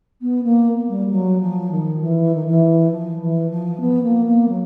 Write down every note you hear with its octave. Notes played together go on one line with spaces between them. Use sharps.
B3
A#3
G3
G3
F#3
F3
D#3
E3
D#3
E3
F3
E3
F3
B3
A#3
A#3
F#3